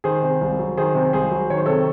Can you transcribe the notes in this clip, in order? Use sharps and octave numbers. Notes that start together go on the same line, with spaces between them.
D#3 G#4 C5
C3
C2
F#3
D#3 G#4 C5
C3
C2 G#4 C5
F#3
D#3 C#5
C5
C3 A4 C#5